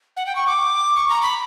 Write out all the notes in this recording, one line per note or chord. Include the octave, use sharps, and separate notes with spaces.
F#5
G5
C#6
D6
C#6
A#5
B5